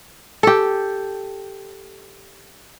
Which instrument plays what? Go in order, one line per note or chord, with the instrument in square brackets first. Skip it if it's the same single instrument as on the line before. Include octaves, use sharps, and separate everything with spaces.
[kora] G4 A4